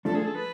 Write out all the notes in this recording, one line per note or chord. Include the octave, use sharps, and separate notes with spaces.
F3 A3 D4 A4
G#4
A4
B4